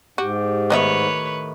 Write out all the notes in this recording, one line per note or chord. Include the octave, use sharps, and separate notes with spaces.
G#2 F#4 G4
A2 D#3 B3 B4 C#5 D#5 E5